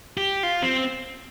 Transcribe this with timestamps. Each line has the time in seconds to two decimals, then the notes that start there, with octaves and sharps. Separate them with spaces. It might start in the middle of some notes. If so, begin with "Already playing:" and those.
0.17 G4
0.43 F4
0.62 C4